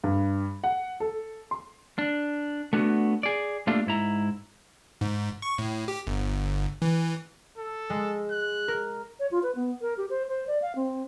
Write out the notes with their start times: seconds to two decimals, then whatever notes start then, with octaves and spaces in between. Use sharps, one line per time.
0.04 G2
0.64 F#5
1.00 A4
1.51 C6
1.99 D4
2.73 A3 B3 D4 F#4
3.23 G#4 D5
3.67 A3 A#3 D4 F4 G4 A4
3.87 G#2 E4 A#5
5.01 G#2
5.42 C#6
5.58 A2
5.88 G4
6.07 G1
6.82 E3
7.58 A4
7.90 G#3
8.31 F#6
8.68 A#4
9.20 C#5
9.31 F4
9.43 B4
9.55 B3
9.82 A#4
9.97 G4
10.10 C5
10.28 C5
10.47 D5
10.62 F5
10.76 C4